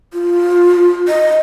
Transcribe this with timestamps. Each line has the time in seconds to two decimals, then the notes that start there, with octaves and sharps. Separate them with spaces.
0.13 F4
1.08 D#5